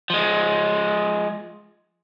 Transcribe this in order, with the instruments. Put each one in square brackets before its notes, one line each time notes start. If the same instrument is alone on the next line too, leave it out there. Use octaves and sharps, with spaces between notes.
[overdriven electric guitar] F3 G#3